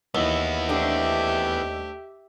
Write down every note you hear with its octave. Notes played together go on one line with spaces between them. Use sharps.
D#2 E3 B3 E4
A3 C4 D4 G4 E5